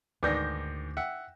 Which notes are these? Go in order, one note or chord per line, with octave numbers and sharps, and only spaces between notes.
D2 G#2 D#3 B4 D5 D6 G6 A#6
E5 F#5 G5